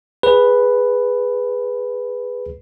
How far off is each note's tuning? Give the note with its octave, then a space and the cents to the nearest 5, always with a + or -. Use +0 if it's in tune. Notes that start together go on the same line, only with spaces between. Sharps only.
G#4 -10 B4 +0